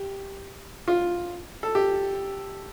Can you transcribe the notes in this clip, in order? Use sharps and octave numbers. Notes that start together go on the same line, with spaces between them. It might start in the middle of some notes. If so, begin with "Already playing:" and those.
Already playing: G4
F4
A4
G4